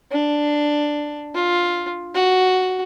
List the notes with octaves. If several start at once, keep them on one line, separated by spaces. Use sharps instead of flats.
D4
F4
F#4